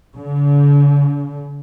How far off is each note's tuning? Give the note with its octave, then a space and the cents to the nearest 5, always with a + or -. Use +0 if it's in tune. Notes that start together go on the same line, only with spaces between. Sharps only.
D3 -45